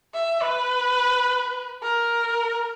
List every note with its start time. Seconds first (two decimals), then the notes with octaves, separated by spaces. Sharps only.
0.14 E5
0.42 B4
1.83 A#4